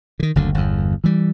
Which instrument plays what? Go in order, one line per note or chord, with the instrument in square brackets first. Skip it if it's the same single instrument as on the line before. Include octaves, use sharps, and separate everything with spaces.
[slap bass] D3 D#3
F#1 D2 D3
G1 E2
E3 G3